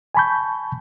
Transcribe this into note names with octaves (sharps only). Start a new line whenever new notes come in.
G#5 A5 B5 C#6 G6